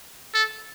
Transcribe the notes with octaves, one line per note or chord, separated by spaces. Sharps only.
A4